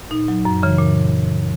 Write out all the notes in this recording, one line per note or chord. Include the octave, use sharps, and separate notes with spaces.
A#2 D#4
F#3
F#2
C#3 E3
A#2